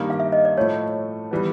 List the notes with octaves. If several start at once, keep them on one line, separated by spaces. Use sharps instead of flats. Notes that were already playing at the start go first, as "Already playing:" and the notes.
Already playing: G2 D#3 G3 A#3
F5
E5
D#5
D5
A2 F3 A3 C#5
E3 G3 B3